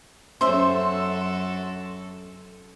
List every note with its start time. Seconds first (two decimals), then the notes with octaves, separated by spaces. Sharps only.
0.41 F#2 C#4 F#4 A4 C5 E5 C6